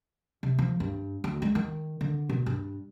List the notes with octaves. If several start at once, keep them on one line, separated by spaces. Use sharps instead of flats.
C3
F3
G2
D2
G#3
D#3
D3
B2
G2